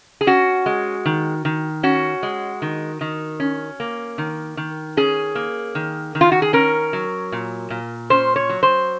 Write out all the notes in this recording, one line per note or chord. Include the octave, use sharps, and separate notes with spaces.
G#4
C#4 F#4
G#3
D#3
D#3
C#4 F#4
G#3
D#3
D#3
C#4
A#3
D#3
D#3
C#4 G#4
A#3
D#3
D#3
F4
F#4
G#4
C#4 A#4
F#3
A#2
A#2
C#4 C5
C#5
F#3
C5